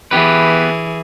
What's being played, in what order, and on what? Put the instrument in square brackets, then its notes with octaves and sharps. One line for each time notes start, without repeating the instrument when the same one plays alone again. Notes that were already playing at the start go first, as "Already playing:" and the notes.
[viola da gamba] E3 G#4 [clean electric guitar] B3 G4 B4